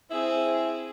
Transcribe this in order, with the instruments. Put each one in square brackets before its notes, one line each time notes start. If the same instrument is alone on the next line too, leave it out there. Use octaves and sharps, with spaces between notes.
[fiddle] C4 G#4 [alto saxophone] E4